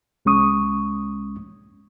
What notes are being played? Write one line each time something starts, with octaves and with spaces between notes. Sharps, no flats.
C2 G#3 C#4 C#6 D#6